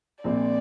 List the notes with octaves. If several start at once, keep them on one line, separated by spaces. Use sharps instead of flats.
A#1 A#2 F3 C4 D5